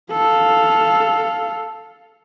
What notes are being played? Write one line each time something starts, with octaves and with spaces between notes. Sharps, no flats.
A4 F5